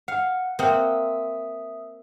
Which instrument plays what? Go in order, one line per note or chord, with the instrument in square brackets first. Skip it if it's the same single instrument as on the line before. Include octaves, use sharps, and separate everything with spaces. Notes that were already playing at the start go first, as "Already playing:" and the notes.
[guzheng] F5 [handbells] F#5
[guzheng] A#3 F#5 [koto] C4 [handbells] E5 D#6 E6